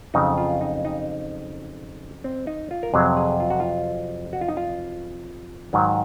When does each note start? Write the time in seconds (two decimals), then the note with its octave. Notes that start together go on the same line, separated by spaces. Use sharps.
0.14 F2 C#3 F#3 D#4
0.37 F4
0.61 D#4
0.85 D#4
2.24 C4
2.47 D#4
2.71 F4
2.83 A#4
2.94 F2 C3 F#3 G#4
3.17 G#4
3.40 F4
3.50 F#4
3.60 F4
4.33 F#4
4.41 F4
4.49 D#4
4.57 F4
5.73 G#2 D#3 F#3